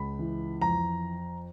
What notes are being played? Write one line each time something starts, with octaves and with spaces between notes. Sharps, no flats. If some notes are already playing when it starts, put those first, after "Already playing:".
Already playing: C#2 B5
E3
F2 A#5